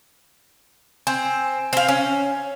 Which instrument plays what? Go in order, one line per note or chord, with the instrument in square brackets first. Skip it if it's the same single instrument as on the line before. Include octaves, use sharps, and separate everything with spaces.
[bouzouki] C4 [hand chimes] G#5 G6
[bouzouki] C4 F5
C#4